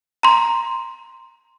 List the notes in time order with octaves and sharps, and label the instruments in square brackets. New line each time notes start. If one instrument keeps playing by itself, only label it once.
[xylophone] A#5 C6